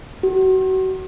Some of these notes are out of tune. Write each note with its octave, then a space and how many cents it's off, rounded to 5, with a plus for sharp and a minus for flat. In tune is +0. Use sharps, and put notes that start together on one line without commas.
F#4 +30